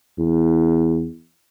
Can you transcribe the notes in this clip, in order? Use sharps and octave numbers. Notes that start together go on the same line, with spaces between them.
E2